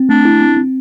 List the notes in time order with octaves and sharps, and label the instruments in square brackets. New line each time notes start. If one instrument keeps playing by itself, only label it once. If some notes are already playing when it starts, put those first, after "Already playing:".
Already playing: [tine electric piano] C4
[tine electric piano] A3 [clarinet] D4
[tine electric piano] E4
C4
C4